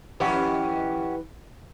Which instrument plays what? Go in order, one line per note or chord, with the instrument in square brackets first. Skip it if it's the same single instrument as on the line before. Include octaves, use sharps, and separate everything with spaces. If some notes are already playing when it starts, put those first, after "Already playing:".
[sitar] F2 C#4 G4 [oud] E3 E4 [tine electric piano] B4 F#5 C#6